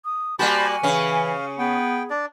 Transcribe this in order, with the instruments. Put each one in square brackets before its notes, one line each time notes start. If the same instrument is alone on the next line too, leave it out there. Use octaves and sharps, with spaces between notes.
[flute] D#6
[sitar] G3 A#3 F#4 [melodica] C5 A5 B5 [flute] G#5
[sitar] C#3 C#4 [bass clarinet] E3 [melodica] F5
[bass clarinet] B3 [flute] G#4 [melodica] G5
[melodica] D4 D5